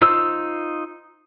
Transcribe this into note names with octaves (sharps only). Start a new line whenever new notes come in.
D#4 F4 C5 E6